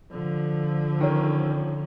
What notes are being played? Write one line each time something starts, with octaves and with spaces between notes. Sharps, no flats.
D3 F3
D#3 C#4